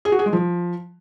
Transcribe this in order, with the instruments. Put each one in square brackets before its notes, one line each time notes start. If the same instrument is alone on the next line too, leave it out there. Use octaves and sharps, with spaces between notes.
[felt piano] G#4
F#4
G#4
G#3
F3